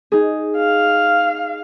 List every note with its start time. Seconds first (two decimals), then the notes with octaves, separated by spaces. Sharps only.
0.12 D#4 G#4
0.56 F5